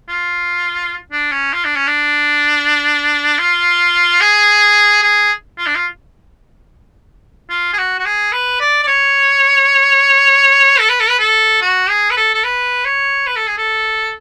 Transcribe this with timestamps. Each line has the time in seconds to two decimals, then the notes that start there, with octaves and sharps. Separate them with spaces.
0.09 F4
1.12 D4
1.32 C#4
1.53 F4
1.65 D4
1.76 C#4
1.88 D4
3.39 F4
4.21 G#4
5.03 G#4
5.58 F4
5.67 D4
5.75 F4
7.50 F4
7.73 G#4
7.78 F#4
7.99 F#4
8.05 G#4
8.32 B4
8.60 D5
8.83 D5
8.87 C#5
10.79 A4
10.89 B4
11.00 A4
11.09 B4
11.19 A4
11.61 F#4
11.89 G#4
12.10 B4
12.17 A4
12.34 A4
12.44 B4
12.85 C#5
13.27 B4
13.36 A4
13.47 G#4
13.58 A4